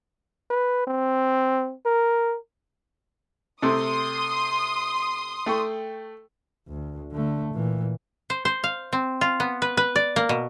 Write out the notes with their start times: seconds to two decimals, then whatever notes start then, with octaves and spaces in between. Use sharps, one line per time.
0.50 B4
0.87 C4
1.85 A#4
3.62 C3 A3 C6 D#6
5.46 A3 G5 C#6
6.68 D2
7.12 D3 A3
7.53 A#2 E3
8.30 C5
8.45 C5
8.64 F5
8.93 C4
9.21 F4
9.40 B3
9.62 B4
9.77 B4
9.96 D5
10.16 A#3
10.29 B2